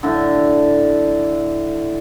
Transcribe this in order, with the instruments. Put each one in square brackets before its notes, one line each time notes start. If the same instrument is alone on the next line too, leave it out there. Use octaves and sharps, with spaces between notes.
[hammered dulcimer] A2 D3